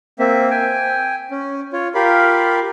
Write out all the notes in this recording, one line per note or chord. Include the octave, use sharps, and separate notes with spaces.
A#3 C4 E5
G5 G#5
C#4
F4 C#5
F4 G4 A#4 F5 B5